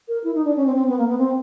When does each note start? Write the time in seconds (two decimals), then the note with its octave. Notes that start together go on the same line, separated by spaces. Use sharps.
0.08 A#4
0.24 E4
0.35 D#4
0.45 D4
0.56 C#4
0.66 C4
0.76 C4
0.88 B3
0.98 A#3
1.08 B3
1.18 C4